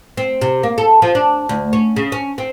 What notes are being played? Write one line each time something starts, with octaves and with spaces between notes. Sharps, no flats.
C4
C3
A#3
A4
F3
D4
D2
C#4
C#3
C#4
C4